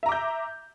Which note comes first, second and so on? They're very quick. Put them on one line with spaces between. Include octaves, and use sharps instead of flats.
E5 A#5 D6 G6